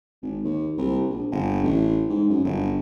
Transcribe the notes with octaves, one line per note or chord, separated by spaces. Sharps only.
G#1
D#2
C2
A#1
G1
A1
G#2
F#2
G1